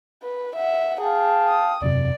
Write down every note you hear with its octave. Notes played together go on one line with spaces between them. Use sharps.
B4
E5 F#5
G#4 F5 G5 A5
D#6
E1 F#2 C3 D5